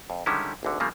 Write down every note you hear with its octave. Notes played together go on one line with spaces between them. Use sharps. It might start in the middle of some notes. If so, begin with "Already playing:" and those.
F2
D3 D#3 G3 G#3 C#4 E4
G#1 D2 D3
C#3 F3 G3 A3 A#3